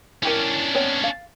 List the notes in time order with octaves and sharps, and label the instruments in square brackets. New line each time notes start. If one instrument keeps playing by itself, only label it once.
[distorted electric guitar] C#4 D4 [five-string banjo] E4 G4 A#4
[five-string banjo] B3 C4 C#5
F5